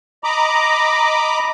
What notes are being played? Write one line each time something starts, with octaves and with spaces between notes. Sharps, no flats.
D#5 A#5 B5 D6